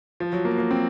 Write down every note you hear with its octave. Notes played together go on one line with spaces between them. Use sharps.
F3
F#3
A#3
A#3
C4